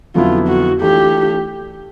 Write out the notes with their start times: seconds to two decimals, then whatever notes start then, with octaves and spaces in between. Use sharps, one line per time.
0.15 F2 D3 F#3 B3 E4 F4
0.49 F#4
0.81 E3 A3 D4 F4 G4